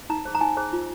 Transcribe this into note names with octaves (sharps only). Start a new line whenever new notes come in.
D#4 A#5
G#4 C5
A#5
D#4 G#5
G#4 C5
F4